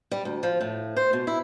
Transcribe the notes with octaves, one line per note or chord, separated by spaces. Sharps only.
G3
D2
F3
A2
C5
B2
E4